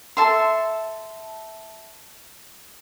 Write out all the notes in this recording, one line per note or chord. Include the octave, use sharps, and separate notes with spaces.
A4 E5 C6